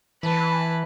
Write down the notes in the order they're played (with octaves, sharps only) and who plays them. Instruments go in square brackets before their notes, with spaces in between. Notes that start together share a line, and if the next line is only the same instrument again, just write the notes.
[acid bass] E3 [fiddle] B4 A5